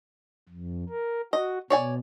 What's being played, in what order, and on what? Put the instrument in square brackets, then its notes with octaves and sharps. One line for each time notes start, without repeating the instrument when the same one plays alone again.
[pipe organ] F2
A#4
[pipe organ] F#4 [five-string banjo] D#5
[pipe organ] B2 [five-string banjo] C#5 D5 G#5